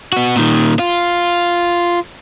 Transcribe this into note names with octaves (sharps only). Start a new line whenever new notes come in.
B3 F#4
A#2 D#3
F4